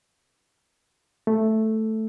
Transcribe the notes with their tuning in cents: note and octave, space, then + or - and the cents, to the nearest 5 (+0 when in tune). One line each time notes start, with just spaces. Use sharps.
A3 +0